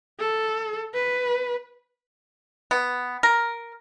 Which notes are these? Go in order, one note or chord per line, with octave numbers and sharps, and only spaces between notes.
A4
B4
B3
A#4